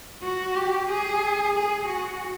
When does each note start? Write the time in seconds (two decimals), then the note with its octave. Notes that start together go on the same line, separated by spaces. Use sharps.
0.23 F#4
0.56 G4
0.90 G#4
1.55 G#4
1.87 F#4